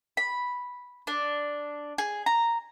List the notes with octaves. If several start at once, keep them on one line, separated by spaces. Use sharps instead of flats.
B5
D4
G#4
A#5